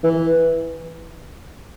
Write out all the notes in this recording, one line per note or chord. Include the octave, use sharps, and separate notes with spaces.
E3